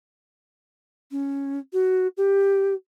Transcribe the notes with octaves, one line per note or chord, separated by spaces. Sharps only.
C#4
F#4
G4